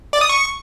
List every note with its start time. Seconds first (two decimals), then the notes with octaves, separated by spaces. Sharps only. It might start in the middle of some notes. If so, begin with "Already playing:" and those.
0.13 D5
0.21 D#6
0.29 C#6